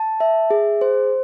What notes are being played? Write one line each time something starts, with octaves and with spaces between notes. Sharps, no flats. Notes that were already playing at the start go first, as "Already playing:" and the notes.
Already playing: A5
E5
G#4
C5